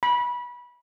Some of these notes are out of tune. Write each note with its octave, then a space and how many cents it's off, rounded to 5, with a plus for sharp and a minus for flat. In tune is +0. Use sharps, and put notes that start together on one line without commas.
B5 -25